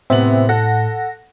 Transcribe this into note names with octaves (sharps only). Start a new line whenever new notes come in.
A2 C3 B3 C4 C5 E5 F#7
A4 F#5 A#6